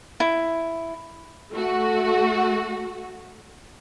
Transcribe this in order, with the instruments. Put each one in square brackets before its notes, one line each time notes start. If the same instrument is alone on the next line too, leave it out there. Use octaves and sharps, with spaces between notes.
[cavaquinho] E4
[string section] A3 F#4